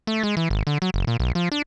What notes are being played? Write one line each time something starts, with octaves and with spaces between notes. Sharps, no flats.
A3
G#3
E3
G#1
D3
F#3
F#1
A#2
B1
F3
D4